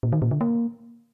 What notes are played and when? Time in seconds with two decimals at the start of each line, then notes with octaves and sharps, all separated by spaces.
0.03 A#2
0.13 D#3
0.22 A#2
0.31 D3
0.41 A#3